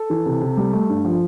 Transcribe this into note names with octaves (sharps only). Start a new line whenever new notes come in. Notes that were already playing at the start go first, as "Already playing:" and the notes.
Already playing: A4
E3
C3
C3
G3
A3
G2
F3